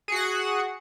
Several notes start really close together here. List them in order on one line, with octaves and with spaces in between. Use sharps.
G#4 F#4 F#5